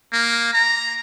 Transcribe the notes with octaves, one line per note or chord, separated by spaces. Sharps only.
A#3
A#5